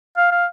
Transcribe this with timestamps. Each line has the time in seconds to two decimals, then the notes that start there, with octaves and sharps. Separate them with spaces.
0.17 F5
0.31 F5